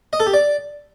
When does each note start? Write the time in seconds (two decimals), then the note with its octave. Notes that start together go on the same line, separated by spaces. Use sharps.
0.13 D#5
0.20 A4
0.27 G4
0.34 D5